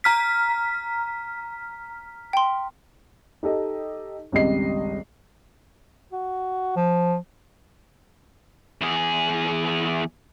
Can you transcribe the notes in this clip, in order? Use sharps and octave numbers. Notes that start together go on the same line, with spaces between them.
A#5 F6 B6
G5 C6
D#4 G4 A4 D#5
G#1 C#2 G3 D#5 C7
F#4
F3
E2 G#4